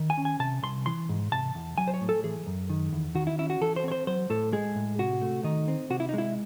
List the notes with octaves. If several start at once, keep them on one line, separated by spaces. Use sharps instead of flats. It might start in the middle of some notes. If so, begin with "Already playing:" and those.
Already playing: D#3
G#5
C#4
G#5
C3 A5
C2 C6
E3 C6
G#2
C3 A5
E2
F#3 G#5
C5
C#5
A2
A4
E3 G#4
F#2
D#3
E2
D#3 F#4
E4
C#4 E4
F#4
E3 A4
C5
C4 C#5
C5
F#3 C5
A2 A4
G#3 G#4
A2
C3 F#4
A3
D#3 D#4
C4
C3 F#4
E4
D#4
G#3 E4